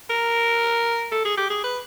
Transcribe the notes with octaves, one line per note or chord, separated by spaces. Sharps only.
A#4
A4
G#4
G4
G#4
B4